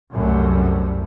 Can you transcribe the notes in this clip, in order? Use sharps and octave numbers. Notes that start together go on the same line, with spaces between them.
C2 F#2 C3 G3 A3